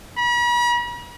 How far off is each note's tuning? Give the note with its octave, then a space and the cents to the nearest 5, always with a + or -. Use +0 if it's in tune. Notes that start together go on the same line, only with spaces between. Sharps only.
B5 -45